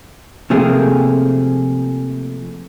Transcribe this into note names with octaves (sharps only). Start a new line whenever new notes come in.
C3 F3 A3 A#3 G#4